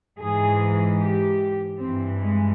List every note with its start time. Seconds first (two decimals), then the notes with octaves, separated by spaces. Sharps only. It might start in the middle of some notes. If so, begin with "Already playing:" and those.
0.19 G#2 E3 G#4
1.00 G4
1.79 G2 E3 C4
2.19 G#3